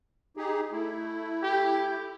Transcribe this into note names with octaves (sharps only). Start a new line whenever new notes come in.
D#4 G4 G#4
A3 E4
G4